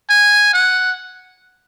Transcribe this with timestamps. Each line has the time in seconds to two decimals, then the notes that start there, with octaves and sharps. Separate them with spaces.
0.10 G#5
0.53 F#5